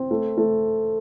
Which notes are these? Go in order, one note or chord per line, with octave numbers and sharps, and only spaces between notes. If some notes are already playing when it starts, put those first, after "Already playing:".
Already playing: C4
A3
A3